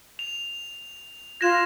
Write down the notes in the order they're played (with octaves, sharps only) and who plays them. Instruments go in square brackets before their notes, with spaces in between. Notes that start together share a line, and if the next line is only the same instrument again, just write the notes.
[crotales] F7
[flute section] F4 F#6 G#6 [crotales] A#6 E7